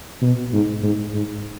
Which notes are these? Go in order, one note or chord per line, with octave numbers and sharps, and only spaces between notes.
B2
G#2
G#2
G#2